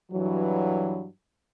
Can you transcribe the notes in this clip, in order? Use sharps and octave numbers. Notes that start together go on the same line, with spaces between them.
G2 E3 F#3